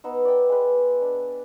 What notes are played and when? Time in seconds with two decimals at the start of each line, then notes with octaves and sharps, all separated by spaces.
0.04 B3 D#4 E6
0.25 D5 G5
0.49 G#3 B4
1.02 D4